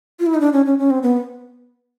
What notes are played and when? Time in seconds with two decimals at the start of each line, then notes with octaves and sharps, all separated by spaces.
0.20 F4
0.26 E4
0.34 D#4
0.41 D4
0.53 C#4
0.66 C#4
0.79 C#4
0.90 C4
1.03 B3